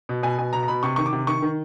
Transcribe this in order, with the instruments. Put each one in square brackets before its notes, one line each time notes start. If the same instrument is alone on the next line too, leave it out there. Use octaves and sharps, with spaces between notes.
[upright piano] B2
B2 G#5
B2 G#5
B2 A#5
A#5
B2 B5
C3 C#6
D#3 C#6
D6
C3
D#3 C#6
D#3